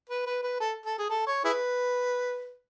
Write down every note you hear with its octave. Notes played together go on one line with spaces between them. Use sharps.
B4
B4
B4
A4
A4
G#4
A4
C#5
E4 G#4 B4